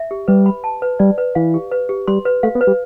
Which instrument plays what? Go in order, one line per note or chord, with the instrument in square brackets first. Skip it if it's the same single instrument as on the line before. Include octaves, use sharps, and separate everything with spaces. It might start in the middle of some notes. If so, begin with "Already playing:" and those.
Already playing: [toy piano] E5
G4
[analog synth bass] G3 [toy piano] B4
[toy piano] B5
A5
B4
[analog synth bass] G3 [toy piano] D5
[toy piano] B4
[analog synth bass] E3 [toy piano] F5
[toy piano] G4
B4
G4
[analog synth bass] G3 [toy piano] C6
[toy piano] B4
[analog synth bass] A3 [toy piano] F5
[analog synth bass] B3
[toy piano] B4
[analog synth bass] G3